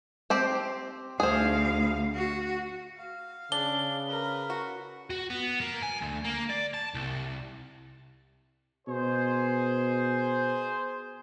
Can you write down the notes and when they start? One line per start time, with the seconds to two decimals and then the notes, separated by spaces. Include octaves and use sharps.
0.30 C4 G4 C5
1.20 D2 G#4 C5 F5
2.15 F#4
2.96 F5
3.52 C#3 D4 G7
4.06 A#4 B4
4.50 F#4
5.10 F#4
5.30 B3
5.61 A#3
5.83 G#5
6.02 D2
6.25 A#3
6.50 D5
6.74 A5
6.95 C2
8.88 B2 G#4 C5